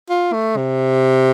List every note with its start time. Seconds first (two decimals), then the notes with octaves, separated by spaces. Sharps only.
0.10 F4
0.33 A3
0.57 C3